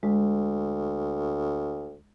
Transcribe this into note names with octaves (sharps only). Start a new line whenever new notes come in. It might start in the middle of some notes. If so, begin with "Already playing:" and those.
D2 G#3